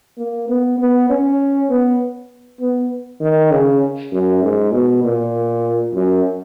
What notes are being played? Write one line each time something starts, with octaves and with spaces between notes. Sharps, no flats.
A#3
B3
B3
C#4
B3
B3
D#3
C#3
F#2
G#2
B2
A#2
F#2